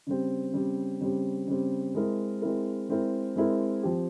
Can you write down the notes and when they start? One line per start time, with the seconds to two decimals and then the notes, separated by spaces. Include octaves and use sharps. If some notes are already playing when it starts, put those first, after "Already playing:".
0.07 C#3 G3 C4
0.53 C#3 G3 C4
1.01 C#3 G3 C4
1.47 C#3 G3 C4
1.95 G#3 C4 E4 A#4
2.42 G#3 C4 E4 A#4
2.89 G#3 C4 E4 A#4
3.36 G#3 C4 E4 A#4
3.83 F3 C4 G4